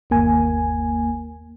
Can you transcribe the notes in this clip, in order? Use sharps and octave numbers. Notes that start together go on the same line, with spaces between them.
G1 D#2 A#3 G#5